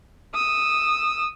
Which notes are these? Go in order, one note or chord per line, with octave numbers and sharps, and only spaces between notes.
D#6 E6